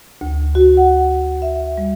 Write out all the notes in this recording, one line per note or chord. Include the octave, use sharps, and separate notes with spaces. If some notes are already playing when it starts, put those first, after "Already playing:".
D2
F#4
F#5
E5
G3